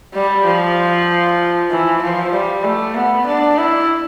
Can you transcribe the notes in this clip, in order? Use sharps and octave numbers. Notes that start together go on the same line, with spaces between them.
G3
F3
E3
F3
G3
A3
B3
D4
E4